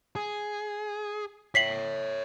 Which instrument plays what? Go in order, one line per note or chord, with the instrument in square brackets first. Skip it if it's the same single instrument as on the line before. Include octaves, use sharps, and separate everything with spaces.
[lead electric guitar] G#4
[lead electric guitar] C#5 E5 [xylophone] B6 C7 F#7